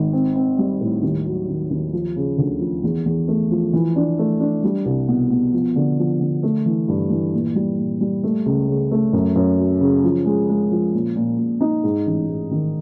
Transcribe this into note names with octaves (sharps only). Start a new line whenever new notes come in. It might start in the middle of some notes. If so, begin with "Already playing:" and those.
Already playing: G#1
C4
C4
G3
A2
D#2
F#3
D#3
D#2
F3
C#3
D2
F3
E2
E2
A3
F3
E3
D4
A3
D4
G3
C2
B2
B2
F3
D3
F3
D3
A3
E3
G2
E3
A#2
G3
A#2
G3
A3
C#2
C#3
A3
F#2
F#2
F#3
C#3
F3
G#3
G#3
F3
A#2
A#2
A#2
D#4
G#2
A1
G#2
D#3